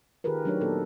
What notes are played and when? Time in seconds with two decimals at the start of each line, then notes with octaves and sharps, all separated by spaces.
0.24 D#3 F4 G4 G#4 A#4 B4
0.45 F#3 A3 D4 D#4 G4 C#5
0.61 A#2 A#3 B3 A4